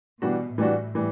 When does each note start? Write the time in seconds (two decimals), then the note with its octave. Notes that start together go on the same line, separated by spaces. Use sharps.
0.22 B2 E3 G3 D4 F#4
0.58 A2 E3 G3 D4 F#4
0.95 E3 G3